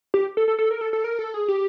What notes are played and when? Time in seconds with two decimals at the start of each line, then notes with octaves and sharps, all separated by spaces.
0.14 G4
0.37 A4
0.48 A4
0.59 A4
0.71 A#4
0.81 A4
0.93 A4
1.04 A#4
1.19 A4
1.34 G#4
1.48 G4